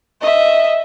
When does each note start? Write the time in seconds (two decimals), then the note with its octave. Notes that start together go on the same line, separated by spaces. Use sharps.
0.21 D#5 E5